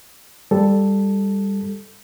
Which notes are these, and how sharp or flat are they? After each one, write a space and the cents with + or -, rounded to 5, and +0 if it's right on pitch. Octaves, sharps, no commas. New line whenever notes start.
G3 +15 A4 +0